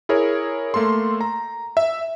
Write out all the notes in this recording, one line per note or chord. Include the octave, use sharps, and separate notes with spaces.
E4 G#4 A#4 C#5
A3 A#3 A4 C6
A#5
E5